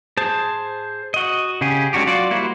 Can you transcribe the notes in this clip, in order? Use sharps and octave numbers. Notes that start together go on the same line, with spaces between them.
G#4 C5 A5
F#4 D#5
C#3 C#4 G4 G#4
G#3 C#4 D4 F#4 G4
F#3 F4 F#4 D5
G3 A#3 E4 F#4 C5